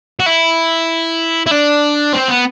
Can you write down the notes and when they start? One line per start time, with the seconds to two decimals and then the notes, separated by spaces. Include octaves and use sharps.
0.20 F#4
0.26 E4
1.46 E4
1.51 D4
2.13 C4
2.28 B3